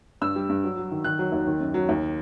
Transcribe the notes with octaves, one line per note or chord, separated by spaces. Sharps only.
G2 E6
G3
G2
F#3
F#3
D#3
D#3 F#6
F#3
D#2
D#3
F#2
F#3
D#2